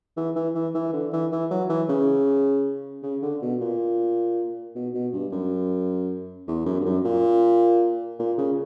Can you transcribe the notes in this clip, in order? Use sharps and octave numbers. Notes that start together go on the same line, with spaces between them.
E3
E3
E3
E3
D3
E3
E3
F#3
E3
C#3
C#3
D3
B2
A#2
B2
B2
G2
F#2
E2
F#2
G2
F#2
A#2
A#2
C#3